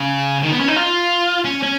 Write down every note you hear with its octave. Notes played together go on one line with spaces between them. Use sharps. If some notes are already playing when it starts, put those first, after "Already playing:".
Already playing: C#3
D#3
B3
C#4
D#4
F4
C#4
C#4